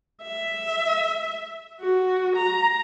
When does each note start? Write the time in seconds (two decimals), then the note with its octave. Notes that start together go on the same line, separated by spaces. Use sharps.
0.23 E5
1.81 F#4
2.36 A#5